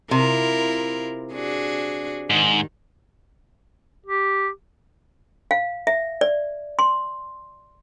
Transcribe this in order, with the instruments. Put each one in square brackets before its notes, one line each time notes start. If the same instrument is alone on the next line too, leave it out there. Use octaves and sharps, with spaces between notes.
[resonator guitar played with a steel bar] C3 [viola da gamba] E4 F4 A#4
[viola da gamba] D4 F#4 G#4
[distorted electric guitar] G#2 [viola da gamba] D#3
[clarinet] G4
[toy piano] F5
E5
D5
C6